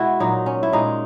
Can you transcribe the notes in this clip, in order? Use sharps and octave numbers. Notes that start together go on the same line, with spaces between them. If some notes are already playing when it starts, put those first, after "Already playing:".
Already playing: B2 G#3 E4 F#4
A#2 F#3 D#4
C#4
E4
A#2 G#3 D#4